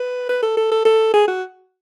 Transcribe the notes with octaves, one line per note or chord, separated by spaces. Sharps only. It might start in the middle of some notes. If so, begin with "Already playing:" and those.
Already playing: B4
B4
A4
A4
A4
A4
G#4
F#4